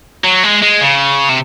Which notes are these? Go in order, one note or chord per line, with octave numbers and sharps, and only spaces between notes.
F#3
G#3
G#3
C#3
C3